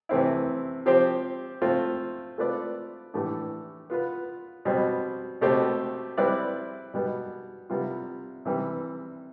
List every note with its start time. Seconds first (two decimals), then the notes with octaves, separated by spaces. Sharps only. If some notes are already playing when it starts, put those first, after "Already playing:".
0.09 C3 E3 A3 C4 E4
0.86 F3 C4 G4 C5
1.62 A3 C4 F4
2.38 A3 C4 F4 B4 D5
3.14 A2 E3 A3 D4 G4
3.90 B3 F4 B4
4.65 B2 G3 C4
5.41 B2 A3 C4 G4
6.17 G3 C4 E4 B4 D5
6.94 B2 G3 B3
7.70 C3 G3 B3 F4
8.45 C3 E3 G3